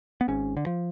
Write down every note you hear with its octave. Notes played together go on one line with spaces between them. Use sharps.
B3
G#1 G#2 C#4
D3
F3